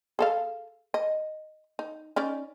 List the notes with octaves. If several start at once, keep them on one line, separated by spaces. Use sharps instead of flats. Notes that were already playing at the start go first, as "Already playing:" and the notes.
G#4 A4 F5
D#5
D#4
C#4 D#4 D5